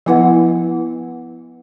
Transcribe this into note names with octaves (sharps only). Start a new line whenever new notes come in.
F3 B3 E4 B4 F#5